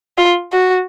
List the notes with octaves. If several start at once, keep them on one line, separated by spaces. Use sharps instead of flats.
F4
F#4